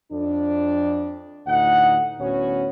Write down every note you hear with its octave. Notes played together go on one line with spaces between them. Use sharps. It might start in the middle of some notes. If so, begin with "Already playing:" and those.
F2 D4
D2 A2 D#4 F#5
D2 A2 B3 C#4 F#4 C#5